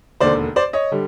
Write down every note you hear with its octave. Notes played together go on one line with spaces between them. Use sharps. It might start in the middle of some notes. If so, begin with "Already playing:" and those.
E1 D#2 D3 C5 D5
C5 D5
C#5 D#5
D3 G3